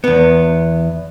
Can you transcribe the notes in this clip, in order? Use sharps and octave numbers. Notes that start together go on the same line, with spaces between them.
E2 B3